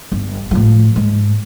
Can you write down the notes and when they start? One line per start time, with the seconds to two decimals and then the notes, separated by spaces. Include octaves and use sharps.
0.12 G1
0.51 A2 F3
0.96 G#2